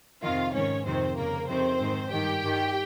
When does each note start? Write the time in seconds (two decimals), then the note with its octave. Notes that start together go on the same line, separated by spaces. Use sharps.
0.22 F2 C3 D#3 F4 F5
0.53 G#2 D#3 C#4 C#5
0.86 F2 C3 D#3 C4 C5
1.17 F2 C#3 A#3 A#4
1.48 F2 C3 D#3 C4 C5
1.80 G#2 D#3
2.11 G2 D#3 G4 G5
2.43 G2 D#3